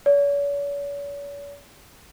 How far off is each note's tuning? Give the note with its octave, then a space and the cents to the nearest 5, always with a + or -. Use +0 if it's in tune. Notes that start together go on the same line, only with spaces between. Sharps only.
C#5 +45